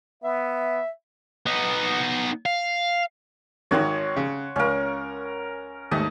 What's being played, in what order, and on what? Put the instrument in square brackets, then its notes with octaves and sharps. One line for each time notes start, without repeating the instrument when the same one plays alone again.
[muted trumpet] B3 [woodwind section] E5
[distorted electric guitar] B3 D#4
F5
[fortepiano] G#1 D#3 [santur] C#5 F#5 C6
[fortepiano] C#3
[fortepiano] C#2 F5 [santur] C#4 A#4
[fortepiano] D#2 G#2 A3 [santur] D#5